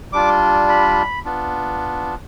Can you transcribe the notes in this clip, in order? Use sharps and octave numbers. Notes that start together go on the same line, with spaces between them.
G3 D4 F4 D6
B5
B3 D4 F4